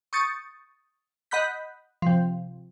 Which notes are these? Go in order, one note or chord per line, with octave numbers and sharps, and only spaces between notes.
C#6 D#6 G6 A6 C#7
D#5 F#5 B5 F#6 G6 B6
C3 F3